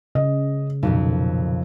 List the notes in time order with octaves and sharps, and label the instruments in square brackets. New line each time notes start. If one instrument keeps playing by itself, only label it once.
[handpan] C#3 [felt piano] D#5
[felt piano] B1 [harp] F2 A#2 F3